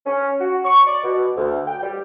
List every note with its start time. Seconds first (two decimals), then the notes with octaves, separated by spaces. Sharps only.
0.06 C#4
0.40 F#4
0.65 C#6
0.87 D5
1.04 B2
1.37 D2
1.68 G5
1.83 G3